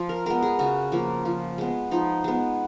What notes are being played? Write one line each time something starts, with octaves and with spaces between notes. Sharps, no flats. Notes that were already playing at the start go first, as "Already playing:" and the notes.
Already playing: F3
A#4
G#3 B3 A#4
G#4
C#3 F#4
F3 A#3
F3
G#3 B3
F3 D#4
G#3 B3